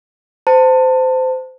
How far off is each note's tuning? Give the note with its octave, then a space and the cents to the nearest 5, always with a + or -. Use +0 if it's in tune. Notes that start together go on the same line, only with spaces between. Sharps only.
C5 -25 A5 +25